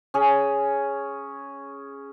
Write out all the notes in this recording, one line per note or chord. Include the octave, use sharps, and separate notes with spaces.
C#4 G#4